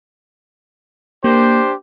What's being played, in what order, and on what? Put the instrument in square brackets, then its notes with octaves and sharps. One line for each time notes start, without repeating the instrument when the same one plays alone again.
[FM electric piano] A#3 [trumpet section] D4 G4 C5